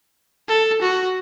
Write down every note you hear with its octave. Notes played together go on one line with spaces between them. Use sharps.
A4
F#4